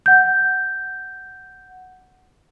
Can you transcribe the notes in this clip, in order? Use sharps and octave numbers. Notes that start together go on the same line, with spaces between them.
F#5 G6